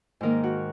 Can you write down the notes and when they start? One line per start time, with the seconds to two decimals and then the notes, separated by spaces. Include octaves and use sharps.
0.21 G#2 D#3 A#3 D#4 A#4
0.44 F#4